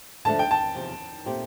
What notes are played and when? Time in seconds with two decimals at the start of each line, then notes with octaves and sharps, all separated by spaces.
0.25 D3 F3 A3 A5
0.39 G5
0.51 A5
0.75 E2 C3 F3
1.26 A#2 A3 C4 G4